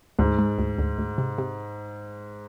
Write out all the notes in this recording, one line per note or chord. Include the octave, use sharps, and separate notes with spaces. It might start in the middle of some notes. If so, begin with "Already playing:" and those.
D2 G#2
G#3
D2
D2
D2
C3
C3